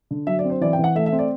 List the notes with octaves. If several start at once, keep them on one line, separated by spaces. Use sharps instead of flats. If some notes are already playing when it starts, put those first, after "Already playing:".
D3
F#3 E5
D5
C4
C5
E3 D5
G5
E3
F#5
A3 E5
E5
C4
D5